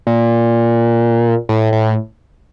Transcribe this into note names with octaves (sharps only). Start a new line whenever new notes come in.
A#2
A2
A2